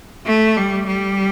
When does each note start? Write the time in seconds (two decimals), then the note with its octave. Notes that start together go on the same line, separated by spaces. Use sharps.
0.26 A3
0.57 G3
0.87 G3